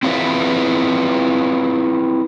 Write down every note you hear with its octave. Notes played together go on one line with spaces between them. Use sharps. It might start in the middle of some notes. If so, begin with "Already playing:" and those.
C4 E4 F4 G#4 B4 E5